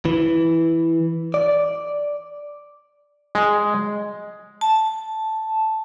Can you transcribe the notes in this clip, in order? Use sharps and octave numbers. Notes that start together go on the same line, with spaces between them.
E3
D5
G#3
A5